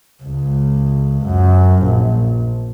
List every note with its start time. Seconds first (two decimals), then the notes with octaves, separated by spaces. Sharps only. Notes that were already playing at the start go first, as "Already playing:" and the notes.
0.24 C#2
1.26 F#2
1.83 A#1